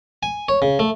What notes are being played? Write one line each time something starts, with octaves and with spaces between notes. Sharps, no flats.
G#5
C#5
C#3
A3